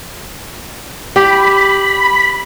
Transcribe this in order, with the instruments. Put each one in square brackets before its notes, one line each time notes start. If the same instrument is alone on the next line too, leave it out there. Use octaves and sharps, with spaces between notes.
[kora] G4 [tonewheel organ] B5